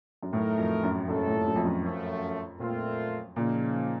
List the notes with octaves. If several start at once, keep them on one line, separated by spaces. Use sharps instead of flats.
F#2
A2 F#3 A3 D#4 A#4
F2
F#2
C2 F#2 A#2 A3 C#4 A4
A2
F#2
F2
F#2
F#2 F3 A3
A#2 A3 C4 F4
A#2 C#3 F3 A#3 D#4